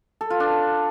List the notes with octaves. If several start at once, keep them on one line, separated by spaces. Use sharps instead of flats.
A4
F4
D4